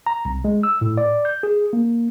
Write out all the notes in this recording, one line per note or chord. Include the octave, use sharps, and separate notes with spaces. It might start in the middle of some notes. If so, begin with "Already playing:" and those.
A#5
C2
G#3
E6
A2
D5
G6
G#4
A#3